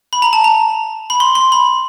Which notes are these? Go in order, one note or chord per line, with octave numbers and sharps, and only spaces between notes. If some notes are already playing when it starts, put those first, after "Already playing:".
B5
A#5
A5
A#5
B5
C6
C6
B5